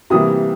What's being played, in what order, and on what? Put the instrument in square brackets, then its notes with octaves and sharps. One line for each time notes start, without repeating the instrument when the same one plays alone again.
[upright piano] C3 E3 G3 A#3 D#6